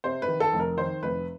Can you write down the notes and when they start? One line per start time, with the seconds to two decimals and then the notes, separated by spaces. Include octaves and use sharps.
0.04 C3 C5
0.22 B4
0.28 D#3
0.40 A4
0.53 F1
0.60 A#4
0.77 D#3 C5
1.02 F1 B4